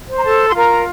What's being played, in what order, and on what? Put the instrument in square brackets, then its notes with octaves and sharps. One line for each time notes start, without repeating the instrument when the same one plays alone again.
[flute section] C5
A#5
A4 A5
C6
F4 A#4 A#5